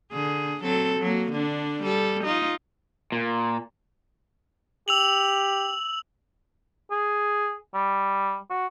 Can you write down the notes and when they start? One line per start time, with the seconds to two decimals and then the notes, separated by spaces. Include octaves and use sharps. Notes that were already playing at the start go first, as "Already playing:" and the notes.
0.13 D3 G#4
0.63 F#3 C4 A4
1.00 F#3 A#3
1.32 D3 D4
1.83 G3 A4
2.24 D#4 F4
3.12 A#2
4.88 G4 E6 F7 F#7
6.91 G#4
7.74 G3
8.50 F#4